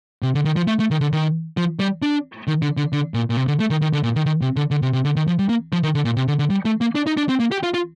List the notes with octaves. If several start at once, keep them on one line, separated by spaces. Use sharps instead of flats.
C3
D3
D#3
F3
A3
A3
D#3
D3
D#3
F3
G3
D4
D#3
D3
D3
D3
A#2
A#2
C3
D3
A3
D#3
D#3
D3
A#2
D#3
D#3
C3
D3
D3
C3
C3
D3
D#3
F3
G3
A#3
F3
D#3
D3
A#2
C3
D3
D3
G3
A3
A#3
D4
D#4
D4
C4
A#3
G4
F4
F4